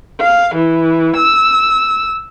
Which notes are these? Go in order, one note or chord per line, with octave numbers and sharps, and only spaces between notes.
F5
E3
E6